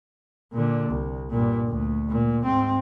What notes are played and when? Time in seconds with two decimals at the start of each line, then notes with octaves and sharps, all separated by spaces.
0.52 A#2 D3
0.90 C2
1.30 G2 A#2
1.67 D2
2.09 A#2
2.44 G#2 C4